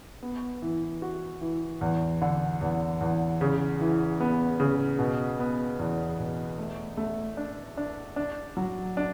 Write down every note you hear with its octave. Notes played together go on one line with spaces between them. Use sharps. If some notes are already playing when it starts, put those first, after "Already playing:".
B3
E3
F#4
E3
E2
D3
E2
E2
C#3
E3
B3
C#3
B2
B3
E2
B2
A3
A3
D4
D4
D4
F#3
D4